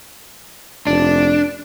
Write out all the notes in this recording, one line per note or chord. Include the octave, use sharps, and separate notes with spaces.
F1 D4